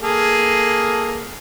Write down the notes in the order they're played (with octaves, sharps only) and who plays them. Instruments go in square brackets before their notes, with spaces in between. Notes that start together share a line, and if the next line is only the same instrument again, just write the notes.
[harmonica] A#3 G#4 A4